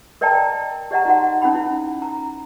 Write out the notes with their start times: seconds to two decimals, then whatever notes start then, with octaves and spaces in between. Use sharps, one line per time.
0.21 A#4 D5 D#5 G5 A5 A#5
0.91 G4 D5 D#5 F#5 A#5
1.05 D#4 F#4 F#5
1.42 C#4 D#4 F#5 B5
1.55 E4
2.02 A#5